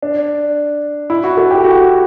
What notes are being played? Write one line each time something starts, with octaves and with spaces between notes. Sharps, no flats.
D4
E4
F#4
A4
G4
F#4